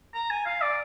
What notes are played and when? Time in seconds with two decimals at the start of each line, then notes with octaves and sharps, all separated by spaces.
0.14 A#5
0.30 G#5
0.46 F5
0.61 D5